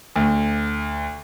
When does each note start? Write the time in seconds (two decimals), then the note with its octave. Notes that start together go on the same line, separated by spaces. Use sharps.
0.16 D2